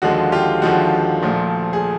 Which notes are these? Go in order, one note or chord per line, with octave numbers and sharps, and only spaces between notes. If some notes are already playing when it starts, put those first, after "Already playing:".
D#2 D3 F3 G#3 F#4
F4 G4
D#2 D3 F3 G#3 F#4
A#1 A#2 F3 A3
G#4